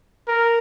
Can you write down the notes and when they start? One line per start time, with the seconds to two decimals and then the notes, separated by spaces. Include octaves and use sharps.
0.28 A#4